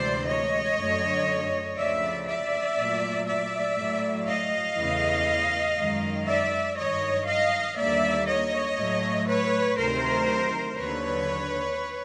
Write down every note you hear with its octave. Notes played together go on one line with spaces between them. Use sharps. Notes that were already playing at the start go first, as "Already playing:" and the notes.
Already playing: D2 C3 E3 G#3 C5 D5
C#5 D#5
F#2 D3 F#3 A3
D2 C#3 F3 D5 E5
D5 E5
A#2 F#3 A3
D5 E5
A2 F#3 A3
D#5 F5
E2 C#3 E3 A3
F#2 D#3 G#3
D5 E5
G2 D#3 F#3 C#5 D#5
D#5 F5
D#2 D3 G3 A#3 D5 E5
C#5 D#5
A2 F#3 A3
B4 C#5
D2 C3 D#3 F#3 A3 A#4 C5
D#2 D3 F#3 B4 C#5